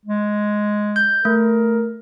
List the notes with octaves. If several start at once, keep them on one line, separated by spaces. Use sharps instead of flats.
G#3
G6
A3 A#4